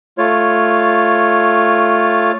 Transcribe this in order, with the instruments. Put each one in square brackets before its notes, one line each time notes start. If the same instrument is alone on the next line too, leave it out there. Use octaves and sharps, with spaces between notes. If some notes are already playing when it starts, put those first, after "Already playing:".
[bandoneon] A3 F4 C#5